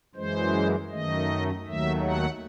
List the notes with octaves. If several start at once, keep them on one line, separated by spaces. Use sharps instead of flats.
F#2 E3 G#3 C5
F#2 D#3 A3 D#5
D#2 D#3 F#3 A3 E5
F#5